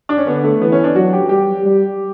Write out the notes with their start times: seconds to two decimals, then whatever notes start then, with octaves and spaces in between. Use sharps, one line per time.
0.09 D4
0.17 C#4
0.27 D3 B3
0.44 A3
0.61 E3 B3
0.72 C#4
0.84 D4
0.95 F#3 F#4
1.13 G4
1.29 G3 G4
1.64 G3